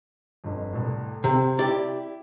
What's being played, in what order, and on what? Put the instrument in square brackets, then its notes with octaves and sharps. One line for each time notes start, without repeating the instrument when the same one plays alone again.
[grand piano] G1 F2
C2 A2
[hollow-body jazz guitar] C3 [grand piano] C5
[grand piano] E4 [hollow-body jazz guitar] G4 D5